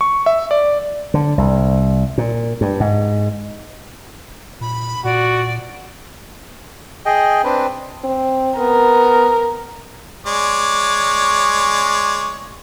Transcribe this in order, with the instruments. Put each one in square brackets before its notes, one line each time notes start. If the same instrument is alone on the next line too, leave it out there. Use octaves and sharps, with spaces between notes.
[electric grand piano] C#6
E5
D5
[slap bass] D3
C2
A#2
G2
G#2
[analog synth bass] A#2 [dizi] B5
[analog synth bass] A#2 [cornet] F#4 [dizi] D5
[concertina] G#4 D#5 G5
C4 D4 B4
[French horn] C4
[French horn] B3 [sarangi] A#4
[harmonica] G#3 C#5 D5